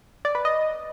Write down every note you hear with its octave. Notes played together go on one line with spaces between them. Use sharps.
D5
B4
D#5